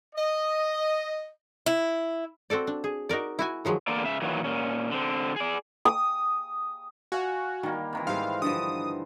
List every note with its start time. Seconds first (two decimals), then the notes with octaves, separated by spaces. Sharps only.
0.16 D#5
1.66 E4
2.50 C4 F#4 A4 D5
2.67 D4
2.84 G#4
3.09 D#4 F#4 A#4 D5
3.39 E4 F#4 G#5
3.65 D#3 F3 F#3 G#3
3.87 E2 D3 A#3 D5
4.03 C#3 E5
4.22 A#2 D#3 E3 F#3
4.44 A#2 C#4
4.91 D3 C4
5.36 G#4 D5
5.85 D#6
7.12 F#4 F5 F#5 G#5
7.63 D#3 G3 A#3
7.93 C3 D#3 E3
8.07 G#2 G3 B4 C5 F5
8.42 G2 D3 F3 D#6